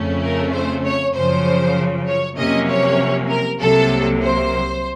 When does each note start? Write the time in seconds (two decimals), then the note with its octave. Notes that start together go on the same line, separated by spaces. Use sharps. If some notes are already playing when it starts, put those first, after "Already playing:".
Already playing: F2 C#3 A3 C#4
0.23 A#4
0.53 C5
0.85 C#5
1.15 F#2 C#3 F3 C5
2.07 C#5
2.37 F2 C3 F#3 A#3 C#4 D#5
2.69 C#5
3.29 A#4
3.60 C2 C3 F#3 A#3 A4
4.22 C5